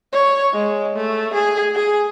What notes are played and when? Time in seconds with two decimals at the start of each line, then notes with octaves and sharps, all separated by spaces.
0.13 C#5
0.53 G#3
0.96 A3
1.34 G#4
1.75 G#4